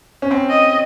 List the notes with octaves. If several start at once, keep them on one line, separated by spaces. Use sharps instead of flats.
C#4
C4
D#5